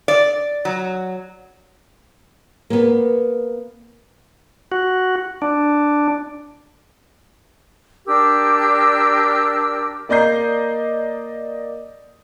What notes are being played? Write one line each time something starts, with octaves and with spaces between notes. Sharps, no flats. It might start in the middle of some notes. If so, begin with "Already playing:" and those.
D5
F#3
A#3 B3
F#4
D4
D4 G4 A#4 E6
A#3 D5 D#5 A#5 G6 C7